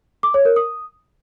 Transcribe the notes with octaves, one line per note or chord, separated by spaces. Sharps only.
D6
C#5
A#4
D#6